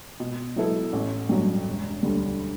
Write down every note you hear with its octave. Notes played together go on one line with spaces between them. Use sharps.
B2
F#3 B3 E4 A4
A1
G2 F#3
E1
D2 D3 G3 D4